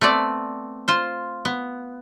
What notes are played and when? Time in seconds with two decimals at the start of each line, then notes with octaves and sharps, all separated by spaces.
0.01 A3 B3 C4 D5
0.88 F4 C5
1.45 B3